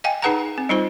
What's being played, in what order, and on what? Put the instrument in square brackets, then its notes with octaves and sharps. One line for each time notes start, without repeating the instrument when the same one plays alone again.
[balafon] D#5 F5 G5 G#5
D#4 G#4 B4 F#5 A5 A#5
C4
G3 D#4 F4 C5